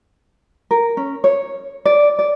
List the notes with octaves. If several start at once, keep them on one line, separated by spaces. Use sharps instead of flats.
A#4
C#4
C#5
D5
D5